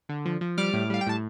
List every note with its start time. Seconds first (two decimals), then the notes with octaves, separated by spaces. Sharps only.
0.09 D3
0.25 F3
0.41 F3
0.58 G3 D6 F6
0.73 A2
0.90 G3 F5
1.01 G5
1.07 A2 A5